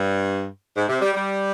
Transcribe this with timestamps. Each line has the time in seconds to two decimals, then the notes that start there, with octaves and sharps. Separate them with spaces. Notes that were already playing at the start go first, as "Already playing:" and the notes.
Already playing: G2
0.76 G#2
0.89 C3
1.02 G3
1.14 G3